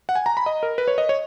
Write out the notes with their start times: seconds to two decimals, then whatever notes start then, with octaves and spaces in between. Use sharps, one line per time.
0.09 F#5
0.15 G#5
0.26 A#5
0.37 B5
0.46 D#5
0.63 A#4
0.78 B4
0.88 C#5
0.98 D#5
1.09 C#5